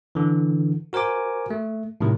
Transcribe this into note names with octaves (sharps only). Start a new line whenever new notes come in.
D3 E3
F#4 A#4 C5 G#5 D6
A3
A2 C3 D#3 F#3